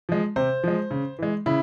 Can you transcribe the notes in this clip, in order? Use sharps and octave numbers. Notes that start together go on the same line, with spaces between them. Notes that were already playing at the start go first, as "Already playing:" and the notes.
F3 G#3
C3 C5
F3 G#3
C#3
E3 G#3
C#3 E4